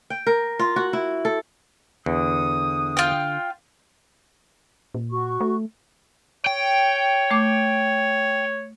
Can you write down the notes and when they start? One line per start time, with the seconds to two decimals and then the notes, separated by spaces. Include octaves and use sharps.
0.10 G5
0.27 A#4
0.59 F4
0.76 F#4
0.93 E4
1.25 A4
2.06 E2 D3 D#6
2.97 F4 G5
4.95 A#2
5.11 F#4 C#6
5.41 A3
6.46 C#5 G5
7.31 A3 D6